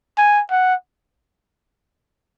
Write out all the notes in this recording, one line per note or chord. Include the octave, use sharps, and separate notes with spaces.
G#5
F#5